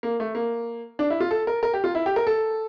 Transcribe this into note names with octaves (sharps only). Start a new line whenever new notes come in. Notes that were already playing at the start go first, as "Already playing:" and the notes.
A#3
A3
A#3
D4
E4
F4
A4
A#4
A#4
G4
F4
E4
G4
A#4
A4